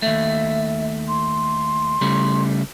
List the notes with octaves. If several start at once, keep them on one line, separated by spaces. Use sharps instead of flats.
D#2 A3 E5
C6
C#3 G3 A3